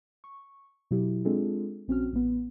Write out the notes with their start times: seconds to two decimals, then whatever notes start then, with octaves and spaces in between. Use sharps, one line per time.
0.24 C#6
0.91 B2 F#3 E4 G4
1.25 G#3 C4 D4 F4 G#4 A4
1.88 A#1 C4 C#4 F#4 F6
2.13 A1 B3